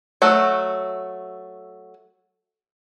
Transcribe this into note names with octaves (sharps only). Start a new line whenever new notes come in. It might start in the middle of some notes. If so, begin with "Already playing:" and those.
F#3 A3 F#4